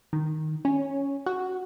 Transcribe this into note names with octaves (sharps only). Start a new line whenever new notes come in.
D#3
C#4
F#4